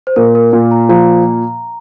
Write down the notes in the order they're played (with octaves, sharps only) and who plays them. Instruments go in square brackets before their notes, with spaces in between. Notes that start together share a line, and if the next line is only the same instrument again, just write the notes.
[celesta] C5
[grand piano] A#2 [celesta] A#4
[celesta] A#4
[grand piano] A#2
[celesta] A#5
[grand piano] F3 [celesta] A#5